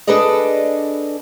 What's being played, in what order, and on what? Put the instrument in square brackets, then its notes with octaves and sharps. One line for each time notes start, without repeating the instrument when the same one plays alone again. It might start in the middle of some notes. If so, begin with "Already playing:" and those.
[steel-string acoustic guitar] D4 G#4 A4 B4 D5 D#5